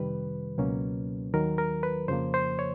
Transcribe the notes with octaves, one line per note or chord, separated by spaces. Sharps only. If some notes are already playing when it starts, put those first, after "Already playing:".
Already playing: F2 C3 D#3 G3 B4
C#2 B2 F#3 A#3 C#4
D#2 D#3 F#3 A#4
A#4
B4
F2 C#3 F3 A#3 C5
C5
C#5